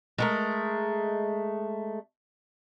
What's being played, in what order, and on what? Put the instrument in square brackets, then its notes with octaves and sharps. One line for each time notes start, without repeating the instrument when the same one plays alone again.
[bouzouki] G#3 A3 A#4